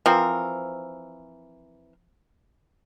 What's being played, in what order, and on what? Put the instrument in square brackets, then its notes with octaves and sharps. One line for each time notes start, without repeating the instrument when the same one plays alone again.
[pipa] E3 C4 A#4 [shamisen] F3